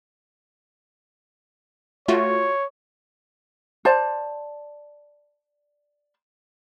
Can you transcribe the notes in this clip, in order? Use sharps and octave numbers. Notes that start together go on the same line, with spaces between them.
A3 F4 F#4 C#5
C5 D5 A5